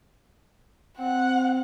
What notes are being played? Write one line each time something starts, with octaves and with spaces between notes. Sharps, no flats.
C4 F#5